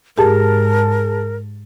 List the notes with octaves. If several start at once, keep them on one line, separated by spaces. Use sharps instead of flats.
G#2 G4 G#4 A#4 A5